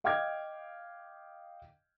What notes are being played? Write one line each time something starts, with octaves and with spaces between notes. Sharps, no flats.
D#5 F5 G5 D6 F6 G#6